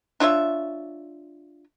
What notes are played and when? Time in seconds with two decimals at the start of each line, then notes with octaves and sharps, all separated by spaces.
0.20 D4 F4 C#5 E5